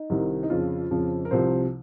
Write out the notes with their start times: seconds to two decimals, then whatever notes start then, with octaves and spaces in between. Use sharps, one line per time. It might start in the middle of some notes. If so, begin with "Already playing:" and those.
Already playing: D#4
0.10 C2 C3 D#3
0.43 D#4
0.50 F2 C#3 F3 F4
0.91 F2 C#3 F3
1.25 A#4
1.31 C2 C3 F3 C5